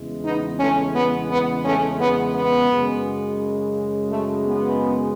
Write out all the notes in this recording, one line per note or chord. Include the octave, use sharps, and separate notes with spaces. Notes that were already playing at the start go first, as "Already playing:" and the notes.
Already playing: E2 C#3 E3 G#3
B3 D#4
A3 C#4
B3
B3
A3 C#4
B3
B3
F#2 C#3 G#3
A3
B3